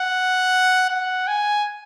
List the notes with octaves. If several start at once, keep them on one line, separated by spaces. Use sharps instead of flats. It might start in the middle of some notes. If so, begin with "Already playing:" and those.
Already playing: F#5
F#5
G#5